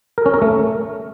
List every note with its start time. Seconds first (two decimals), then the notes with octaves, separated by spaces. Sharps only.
0.18 A#4
0.26 C#4
0.34 A#4
0.42 A3